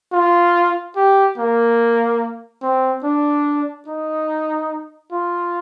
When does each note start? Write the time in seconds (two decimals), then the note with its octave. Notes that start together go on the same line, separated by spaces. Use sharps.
0.13 F4
0.96 G4
1.37 A#3
2.62 C4
3.03 D4
3.87 D#4
5.12 F4